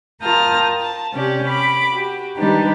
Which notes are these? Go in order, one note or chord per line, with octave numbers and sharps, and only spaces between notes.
F4 A#4 G5 A5 D#6 F6
A5
C3 C#4 G4 D5
B5 D6
F#4 G4
D#3 G3 D4 D#4 G4 B4